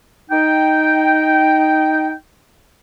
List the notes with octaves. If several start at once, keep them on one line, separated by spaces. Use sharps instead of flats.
D#4 G5